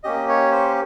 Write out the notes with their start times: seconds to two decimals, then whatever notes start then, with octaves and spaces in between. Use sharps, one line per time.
0.04 A#3 C#4 G4 D#5
0.29 C#5
0.52 C5